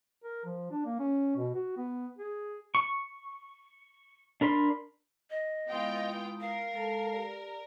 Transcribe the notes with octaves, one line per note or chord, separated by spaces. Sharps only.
A#4
F3
D4
A#3
C#4
B2
F#4
B3
G#4
C#6
D4 A#4 B5 C6
D#5
G#3 B3 E4 F4 G5 D#6
A#4 F5
G#3 A4 A5
G4 D5